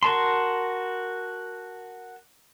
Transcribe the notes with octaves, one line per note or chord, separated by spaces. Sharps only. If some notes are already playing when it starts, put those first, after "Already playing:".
F#4 A#4 A5 C6